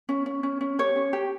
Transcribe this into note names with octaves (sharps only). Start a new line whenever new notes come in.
C#4
C#4
C#4
C#4
G4 C#5
C#4
G4